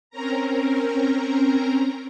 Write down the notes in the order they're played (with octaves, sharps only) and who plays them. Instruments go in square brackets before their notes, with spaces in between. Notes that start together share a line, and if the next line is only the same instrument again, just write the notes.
[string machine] C4 C#4 A#4 A#5